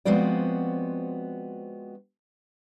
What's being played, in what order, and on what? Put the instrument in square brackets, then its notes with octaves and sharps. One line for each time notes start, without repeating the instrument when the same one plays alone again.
[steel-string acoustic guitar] F3 G#3 B3 C4 F#4 D5